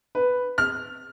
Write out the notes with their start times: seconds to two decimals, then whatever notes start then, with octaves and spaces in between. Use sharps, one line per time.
0.15 B4
0.58 F6